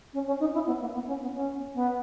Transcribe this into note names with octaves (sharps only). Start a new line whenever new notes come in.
C#4
C#4
D#4
E4
B3
A#3
B3
C#4
B3
C#4
B3